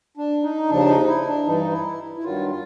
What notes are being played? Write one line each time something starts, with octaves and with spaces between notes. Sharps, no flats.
D4
D#4
D#2 C#3 F3 D4
D#4
E4
D4
G2 E3 D#4
E4
E4
G2 D#3 F#3 F4
F4